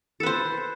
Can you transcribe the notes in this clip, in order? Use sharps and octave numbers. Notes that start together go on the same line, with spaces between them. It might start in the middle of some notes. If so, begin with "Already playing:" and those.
A4 B4 C5